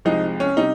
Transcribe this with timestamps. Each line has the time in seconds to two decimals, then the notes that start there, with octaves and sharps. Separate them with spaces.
0.05 C2 C3 F3 G#3 D#4
0.40 C#4
0.57 C3 G3 D#4